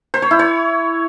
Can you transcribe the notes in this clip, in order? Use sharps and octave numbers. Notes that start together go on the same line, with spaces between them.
C5
C#5
E4
C#5